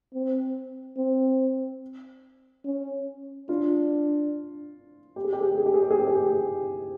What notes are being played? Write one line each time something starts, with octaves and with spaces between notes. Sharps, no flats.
C4
C4
C#4
D4 F4
G4
G#4
G4
G#4
G4
G#4
G4
G#4
G4
G#4
G4
G#4
G4